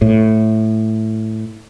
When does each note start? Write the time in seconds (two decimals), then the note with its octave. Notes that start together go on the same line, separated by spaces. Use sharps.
0.02 A2